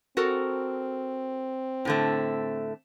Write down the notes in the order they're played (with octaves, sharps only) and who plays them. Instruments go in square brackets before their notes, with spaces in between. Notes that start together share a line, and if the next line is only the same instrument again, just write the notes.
[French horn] C4 [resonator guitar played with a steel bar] F#4 A4 A#4
[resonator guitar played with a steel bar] A2 D3 A3